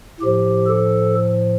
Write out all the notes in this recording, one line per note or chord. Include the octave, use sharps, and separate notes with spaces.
A2 F3 G4
A4